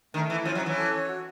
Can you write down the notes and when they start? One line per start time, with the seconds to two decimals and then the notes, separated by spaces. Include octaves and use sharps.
0.14 D#3 A3
0.30 E3 E4
0.45 F3 C#4
0.55 F#3
0.61 C#4
0.66 E3
0.77 A4
0.93 C#5
1.08 F#4